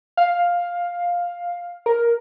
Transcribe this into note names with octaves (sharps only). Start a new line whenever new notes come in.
F5
A#4